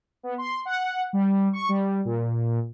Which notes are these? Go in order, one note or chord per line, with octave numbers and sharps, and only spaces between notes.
B3
C6
F#5
G3
C#6
G3
A#2